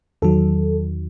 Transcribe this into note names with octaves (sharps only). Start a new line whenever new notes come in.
E2 D#3 F#3 A4